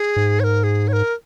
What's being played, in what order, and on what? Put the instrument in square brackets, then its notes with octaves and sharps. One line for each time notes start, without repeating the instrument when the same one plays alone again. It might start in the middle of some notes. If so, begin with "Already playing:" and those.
Already playing: [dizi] G#4
[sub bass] G#2
[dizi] C#5
A#4
G#4
C#5
A#4